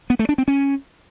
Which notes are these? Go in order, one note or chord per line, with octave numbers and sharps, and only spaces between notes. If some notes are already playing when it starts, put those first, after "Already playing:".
B3
A3
D4
C4
C#4